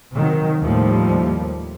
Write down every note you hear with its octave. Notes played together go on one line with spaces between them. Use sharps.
C3 D#3 F#3
D#2 A2 F3 G3 A#3